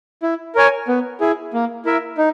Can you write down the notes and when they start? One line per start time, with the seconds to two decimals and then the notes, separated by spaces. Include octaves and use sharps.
0.23 E4
0.55 A#4 C#5 G#5
0.88 B3
1.20 E4 G#4
1.53 A#3
1.85 E4 A#4 E5
2.18 D#4